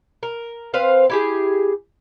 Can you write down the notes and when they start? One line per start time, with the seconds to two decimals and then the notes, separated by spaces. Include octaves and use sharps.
0.23 A#4
0.74 C4 B4 C5 F5
1.10 E4 G4 G#4